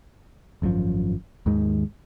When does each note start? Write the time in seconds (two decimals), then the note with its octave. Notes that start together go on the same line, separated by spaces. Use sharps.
0.62 G#1 F#2 C3 F3
1.46 D#2 G#2 D#3 G#3